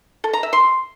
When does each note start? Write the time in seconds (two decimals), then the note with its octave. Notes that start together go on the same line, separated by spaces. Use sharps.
0.24 A4
0.33 A#5
0.43 E5
0.53 C6